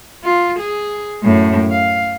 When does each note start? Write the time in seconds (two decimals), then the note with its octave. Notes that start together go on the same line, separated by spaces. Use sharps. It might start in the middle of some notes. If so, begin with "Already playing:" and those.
0.24 F4
0.60 G#4
1.23 F#2 A2
1.72 F5